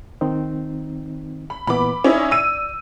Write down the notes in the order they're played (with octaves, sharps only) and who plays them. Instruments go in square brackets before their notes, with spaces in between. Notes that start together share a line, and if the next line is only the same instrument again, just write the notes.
[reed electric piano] D#3 C4 D#4
[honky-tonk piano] B5
[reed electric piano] A#2 E3 B3 [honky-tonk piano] B5 D6
[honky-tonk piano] C#4 D#4 E4 [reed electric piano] D5
[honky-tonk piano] E6 D#7